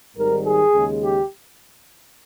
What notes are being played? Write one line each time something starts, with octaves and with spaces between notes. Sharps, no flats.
G#1 G#2 D#3 G3 A#4
G#4
D#2 C#3 G#3
G4